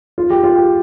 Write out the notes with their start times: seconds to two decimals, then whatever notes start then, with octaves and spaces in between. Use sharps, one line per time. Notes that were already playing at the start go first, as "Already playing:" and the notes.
0.18 F4
0.30 G4
0.44 F4
0.56 G4